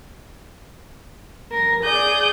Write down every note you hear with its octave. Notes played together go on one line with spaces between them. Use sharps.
A#4
G#4 D5 D#6 G6